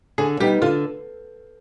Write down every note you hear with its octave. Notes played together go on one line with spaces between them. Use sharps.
D3 G#4
G3 B3 D#4 G4
D3 F4